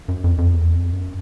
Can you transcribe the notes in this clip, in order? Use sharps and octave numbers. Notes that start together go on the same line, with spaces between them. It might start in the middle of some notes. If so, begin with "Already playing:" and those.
F#2
F2
F2
E2
F2
F#2